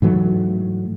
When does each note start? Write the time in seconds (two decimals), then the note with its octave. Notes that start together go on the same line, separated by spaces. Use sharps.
0.02 G#2 E3 F#3 A3